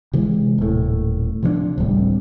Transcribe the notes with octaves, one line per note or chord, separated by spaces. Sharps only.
C3 E3 G#3
D#1 A2
C3 F3 B3 D4
D1 A1 G3 C4